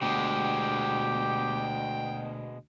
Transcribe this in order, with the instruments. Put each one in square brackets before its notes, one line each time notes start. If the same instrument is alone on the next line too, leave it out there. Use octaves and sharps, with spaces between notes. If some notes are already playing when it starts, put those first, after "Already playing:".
[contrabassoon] D2 [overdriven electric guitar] B2 G#3 [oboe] G4 [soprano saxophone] G5